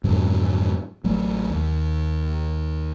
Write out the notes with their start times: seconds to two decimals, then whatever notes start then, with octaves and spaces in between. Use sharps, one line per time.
0.04 F2 G#2 D3 F#3
1.04 A1 F#3 A3
1.50 D#2